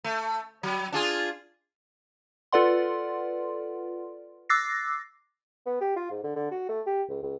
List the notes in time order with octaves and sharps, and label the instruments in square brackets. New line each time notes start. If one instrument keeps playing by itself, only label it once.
[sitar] A3
F#3
D4 F4 G#4
[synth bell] F4 A4 B4 D5 F#5 C6
D6 E6 F#6 A6 A#6 C7
[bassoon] B3
G4
F4
G#2
D3
D3
F#4
A3
G4
C#2
C#2